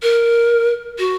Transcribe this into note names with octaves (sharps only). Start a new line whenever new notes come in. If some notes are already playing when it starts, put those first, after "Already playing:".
A#4
F#4